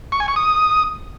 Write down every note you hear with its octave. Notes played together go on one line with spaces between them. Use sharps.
C#6
G#5
C#6
D#6